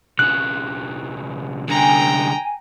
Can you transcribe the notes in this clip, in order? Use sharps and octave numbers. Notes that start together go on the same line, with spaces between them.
B1 C#3 F#6
C2 D3 G5 G#5 A#5